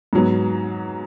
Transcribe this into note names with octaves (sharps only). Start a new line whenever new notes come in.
G#2 F#3 B3